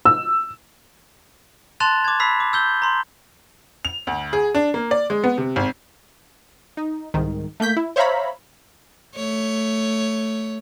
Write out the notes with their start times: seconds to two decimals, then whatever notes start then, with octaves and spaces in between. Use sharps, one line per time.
0.05 E6
1.80 A5 C6 F#6 A6 E7 F7
2.05 D6 G#6
2.20 B5 E6 B6 C7
2.40 D6
2.53 E6 G6 G7
2.82 A#5 C6
3.85 F7
4.07 D2
4.33 G#4
4.55 D4
4.74 A#3
4.91 D5
5.10 G#3
5.24 B3
5.38 C3
5.56 G#1
6.77 D#4
7.14 C2 G#2 D#3
7.60 A3 A#3 G6 B6
7.76 E4
7.96 C5 C#5 E5 F5 A#5 B5
9.15 A3 C#5